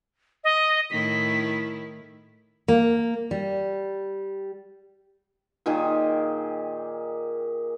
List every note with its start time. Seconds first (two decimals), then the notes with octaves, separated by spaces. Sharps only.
0.44 D#5
0.90 A2 D#3 E4 B6
2.68 A#3
3.31 G3
5.66 A#2 D#3 G4 G#4